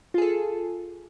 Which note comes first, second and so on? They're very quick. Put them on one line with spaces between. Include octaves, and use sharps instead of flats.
F4 G#4 A4